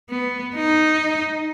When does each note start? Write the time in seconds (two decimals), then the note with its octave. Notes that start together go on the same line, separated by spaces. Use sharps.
0.10 B3
0.56 D#4